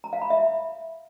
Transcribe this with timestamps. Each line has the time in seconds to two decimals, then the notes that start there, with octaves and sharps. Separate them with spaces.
0.04 A#5
0.13 F5
0.22 B5
0.30 E5